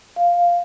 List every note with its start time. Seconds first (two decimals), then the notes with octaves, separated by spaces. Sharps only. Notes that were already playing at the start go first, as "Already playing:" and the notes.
0.16 F5